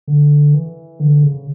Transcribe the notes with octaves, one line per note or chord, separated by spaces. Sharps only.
D3
E3
D3
C#3